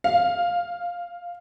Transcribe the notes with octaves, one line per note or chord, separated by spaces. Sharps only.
F5